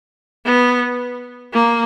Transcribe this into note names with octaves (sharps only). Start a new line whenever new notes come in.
B3
A#3